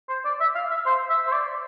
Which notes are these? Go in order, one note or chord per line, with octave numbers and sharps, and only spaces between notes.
C5
D5
E5
F5
E5
C5
E5
C5
D5